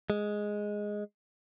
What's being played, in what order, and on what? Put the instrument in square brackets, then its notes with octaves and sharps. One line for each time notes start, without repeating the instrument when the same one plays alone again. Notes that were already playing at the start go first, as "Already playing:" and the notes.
[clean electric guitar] G#3